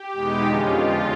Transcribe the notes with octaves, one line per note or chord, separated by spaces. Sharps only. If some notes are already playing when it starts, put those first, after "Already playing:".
Already playing: G4
E2 B2 G#3 B3 D#4
F2 D3 F3 G#3 C#4 F4
E2 C#3 F3